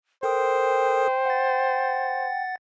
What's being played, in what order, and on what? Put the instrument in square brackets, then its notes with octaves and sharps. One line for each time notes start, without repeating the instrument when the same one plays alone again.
[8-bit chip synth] A4 A#4 D#6 [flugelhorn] C5 [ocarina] G5
[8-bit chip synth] F#5 A6